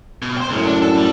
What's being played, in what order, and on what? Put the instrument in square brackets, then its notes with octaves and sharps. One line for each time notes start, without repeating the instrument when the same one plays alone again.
[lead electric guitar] B2
C5 G5
[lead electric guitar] C#2 C#3 [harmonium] F#2 A2
[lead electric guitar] D4
A4
G3